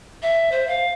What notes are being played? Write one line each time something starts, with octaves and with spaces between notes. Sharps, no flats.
E5
C5
F5